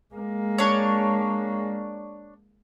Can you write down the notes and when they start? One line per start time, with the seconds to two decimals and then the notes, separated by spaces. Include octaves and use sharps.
0.15 G#3 A#3
0.58 D4 C#5